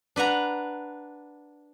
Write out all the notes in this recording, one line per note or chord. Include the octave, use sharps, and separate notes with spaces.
D4 B4 F#5 A#5